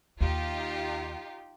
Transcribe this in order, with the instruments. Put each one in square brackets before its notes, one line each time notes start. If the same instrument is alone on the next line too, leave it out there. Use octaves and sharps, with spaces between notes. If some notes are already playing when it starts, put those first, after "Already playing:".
[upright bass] D#2 [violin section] D#4 F4 G4